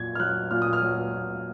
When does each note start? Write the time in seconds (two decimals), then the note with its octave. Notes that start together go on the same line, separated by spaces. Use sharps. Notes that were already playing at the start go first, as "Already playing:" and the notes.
Already playing: A#2 F#3 G#6
0.15 F6
0.20 F#3 F#6
0.51 A#2 F6
0.62 D#6
0.73 F6
0.82 F#3
1.14 A#2